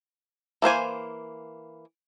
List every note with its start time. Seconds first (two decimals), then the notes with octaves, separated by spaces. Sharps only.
0.62 E3 A#3 C5 G#5